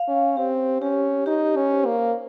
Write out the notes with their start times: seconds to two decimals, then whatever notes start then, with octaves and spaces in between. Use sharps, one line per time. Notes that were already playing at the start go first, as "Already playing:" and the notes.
Already playing: F5
0.08 C#4
0.37 C4 G4
0.82 C#4 G4
1.26 D#4 G4
1.57 C#4
1.71 C5
1.86 A#3